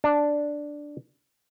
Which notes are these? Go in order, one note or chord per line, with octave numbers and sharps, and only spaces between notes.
D4